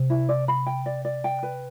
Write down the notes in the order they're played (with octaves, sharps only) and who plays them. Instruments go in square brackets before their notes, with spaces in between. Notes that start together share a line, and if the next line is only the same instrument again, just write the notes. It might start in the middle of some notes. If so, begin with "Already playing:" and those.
Already playing: [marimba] C3
[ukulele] E4
D5
B5
G5
D5
D5
G5
B4